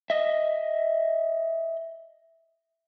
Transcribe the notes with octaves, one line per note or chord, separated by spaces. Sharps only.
D#5 E5